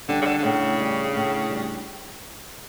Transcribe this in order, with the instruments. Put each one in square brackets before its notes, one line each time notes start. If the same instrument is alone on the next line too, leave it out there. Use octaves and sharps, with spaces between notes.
[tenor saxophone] D3 [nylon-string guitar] G3 D4
[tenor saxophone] C#3
D3
D3
[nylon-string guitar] A2 [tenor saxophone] C#3
[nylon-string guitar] G3 D4
A2
G3 D4